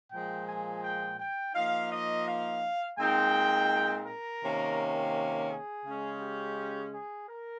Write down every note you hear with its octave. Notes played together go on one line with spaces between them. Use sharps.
A#2 F3 G#3 G5
G#5
G5
G5
F3 A#3 D#4 F5
D#5
F5
A#2 G#3 C4 D#4 G5
A#4
C3 D#3 A#3 C#4
G#4
C#3 G#3 C#4
G4
G#4
A#4